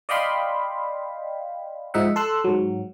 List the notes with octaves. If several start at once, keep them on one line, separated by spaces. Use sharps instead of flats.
D5 D#5 F5 G5 B5 C6
G#2 F3 D#4 E5 F#5
A4 C6 E6 F#6
G#2 F#3